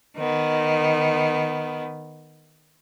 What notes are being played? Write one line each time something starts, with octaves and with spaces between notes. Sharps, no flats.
D#3 B3